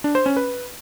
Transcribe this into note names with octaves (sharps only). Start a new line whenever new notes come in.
D4
C5
C#4
B4